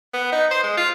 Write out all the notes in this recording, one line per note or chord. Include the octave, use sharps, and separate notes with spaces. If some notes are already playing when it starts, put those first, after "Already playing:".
B3
D#4
C5
G#3
F4